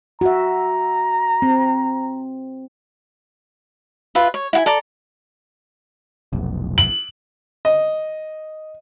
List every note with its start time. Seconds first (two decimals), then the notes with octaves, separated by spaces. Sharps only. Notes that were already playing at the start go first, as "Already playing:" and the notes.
0.21 F#4 E5 A#5
1.42 C4
4.15 F4 B4 E5
4.34 C#5
4.53 E4 F#5 G#5
4.66 A4 D5 A#5
6.33 F1 B1
6.78 F#7
7.65 D#5